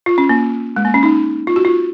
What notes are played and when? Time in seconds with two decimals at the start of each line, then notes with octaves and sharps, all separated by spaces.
0.06 F4
0.18 C#4
0.29 A#3
0.76 G#3
0.85 A#3
0.94 C#4
1.03 D#4
1.47 F4
1.56 F#4
1.65 F4